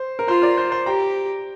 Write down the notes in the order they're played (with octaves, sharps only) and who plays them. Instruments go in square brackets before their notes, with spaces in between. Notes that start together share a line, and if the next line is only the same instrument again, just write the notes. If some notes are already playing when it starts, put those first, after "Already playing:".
Already playing: [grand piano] C5
A#4
[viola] F4 [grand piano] C5
[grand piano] A#4 D5
C5
C5
[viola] G4 [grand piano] G5 A#5